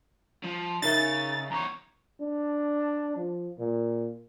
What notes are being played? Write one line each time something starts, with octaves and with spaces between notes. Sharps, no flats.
F3
C#3 D#4 A#4 E5 A6
E2 C#5 A#5
D4
F3
A#2